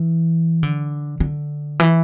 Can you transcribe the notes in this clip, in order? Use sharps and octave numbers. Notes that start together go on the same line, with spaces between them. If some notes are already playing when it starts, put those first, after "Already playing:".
Already playing: E3
D3
D3
E3